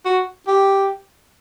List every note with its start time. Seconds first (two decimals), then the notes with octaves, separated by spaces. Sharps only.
0.05 F#4
0.47 G4